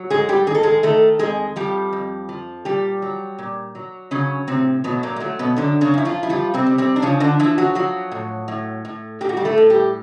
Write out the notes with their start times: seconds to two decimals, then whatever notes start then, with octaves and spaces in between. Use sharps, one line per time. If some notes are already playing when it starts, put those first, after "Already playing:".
Already playing: F#3
0.10 G#2 G#3 G#4
0.29 G3 G4
0.47 D#3 G#4
0.55 A4
0.63 G#3 G#4
0.83 D#3 A3 A4
1.19 F2 G#3 G#4
1.56 F3 G3 G4
1.93 F2
2.29 F3
2.65 A#2 G3 G4
3.02 F#3
3.39 A#2
3.75 F#3
4.11 C#3 F#3 C#4
4.47 A2 C3 C4
4.84 B2 F#3 B3
5.03 A#2 A#3
5.16 G#3
5.20 F#3 A3
5.39 B2 B3
5.56 F#2 D3 D4
5.81 C#3 C#4
5.94 F#2 E4
6.05 F3 F4
6.23 E4
6.29 F3 G3 F4
6.54 C3 C4
6.67 G3
6.78 C3 C4
6.96 D4
7.02 C#3 F3 C#4
7.20 D3 D4
7.39 E3 F3 E4
7.58 F#3 F#4
7.75 F3 F#3 F#4
8.12 A2
8.48 A2
8.85 A2
9.21 A2 G4
9.29 F#4
9.37 G3 G4
9.45 A3 A4
9.58 A2
9.70 G3 G4